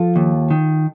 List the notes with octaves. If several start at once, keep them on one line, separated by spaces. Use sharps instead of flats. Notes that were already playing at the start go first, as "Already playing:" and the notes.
Already playing: F3 F4 A4
D#2
D#3